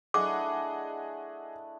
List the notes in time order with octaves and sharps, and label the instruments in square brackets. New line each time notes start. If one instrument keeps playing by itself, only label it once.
[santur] A3 D4 E4 [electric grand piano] G#4 D#5 F#5 [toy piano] D6